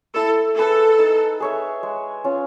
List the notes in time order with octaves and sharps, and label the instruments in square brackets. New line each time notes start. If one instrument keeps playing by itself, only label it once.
[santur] E4 [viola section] A4
[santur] G#4 B4 [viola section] A4
[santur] D#4
G#4 C#5 E5
G#3
C#4 F4